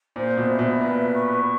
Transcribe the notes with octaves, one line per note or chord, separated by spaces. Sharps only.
A#2 C5
B2
E5
B2
A#2 B4
C#6